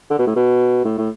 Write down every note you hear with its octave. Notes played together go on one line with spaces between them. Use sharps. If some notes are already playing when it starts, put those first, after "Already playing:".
D3
B2
A2
B2
A2
A2